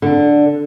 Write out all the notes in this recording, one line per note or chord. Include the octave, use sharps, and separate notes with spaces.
D3